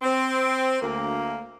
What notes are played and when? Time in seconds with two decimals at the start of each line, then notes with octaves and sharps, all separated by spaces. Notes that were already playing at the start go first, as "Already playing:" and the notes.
0.02 C4
0.81 D2 A#3